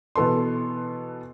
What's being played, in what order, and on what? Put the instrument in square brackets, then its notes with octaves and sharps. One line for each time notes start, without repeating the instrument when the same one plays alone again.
[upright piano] B2 E3 B3 A4 C6